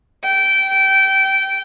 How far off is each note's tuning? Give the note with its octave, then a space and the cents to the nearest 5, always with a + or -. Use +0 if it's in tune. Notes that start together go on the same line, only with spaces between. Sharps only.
G5 -20